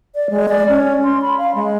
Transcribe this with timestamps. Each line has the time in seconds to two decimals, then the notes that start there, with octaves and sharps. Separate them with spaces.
0.15 D5
0.30 G#3
0.49 D5
0.69 C#4
1.04 C6
1.22 B5
1.38 F5
1.55 G#3